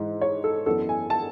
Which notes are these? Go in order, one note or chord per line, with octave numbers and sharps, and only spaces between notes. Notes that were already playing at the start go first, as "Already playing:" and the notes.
Already playing: G#2 E3 G#3
C#5
A4
F#2 E3 B3 D4 A4
G#5
A5